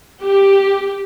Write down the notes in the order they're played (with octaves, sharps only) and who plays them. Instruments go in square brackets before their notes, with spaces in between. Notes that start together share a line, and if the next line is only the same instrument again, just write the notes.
[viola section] G4